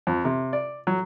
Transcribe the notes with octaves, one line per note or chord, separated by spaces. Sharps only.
F2
C3
D5
F#3